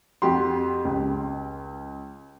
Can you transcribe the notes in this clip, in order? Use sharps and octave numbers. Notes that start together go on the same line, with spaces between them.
F2 F#4 G4 C6
C#2